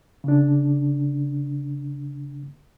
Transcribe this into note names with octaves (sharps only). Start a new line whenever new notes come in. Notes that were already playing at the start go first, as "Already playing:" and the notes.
C#3 D4